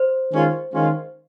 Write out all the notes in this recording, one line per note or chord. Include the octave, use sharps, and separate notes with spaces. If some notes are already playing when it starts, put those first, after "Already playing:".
Already playing: C5
D#3 G#3 C#4 F4
D#3 G#3 C#4 F4